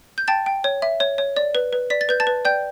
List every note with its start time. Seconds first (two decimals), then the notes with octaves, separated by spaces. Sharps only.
0.18 G6
0.28 G5 A5 A6
0.46 G5
0.64 C#5
0.82 E5
1.00 C#5
1.18 C#5
1.36 D5
1.55 B4
1.73 B4
1.90 D5 B6
2.01 A6
2.09 B4 G6
2.20 A5 A6
2.27 B4
2.45 D5 G5 G6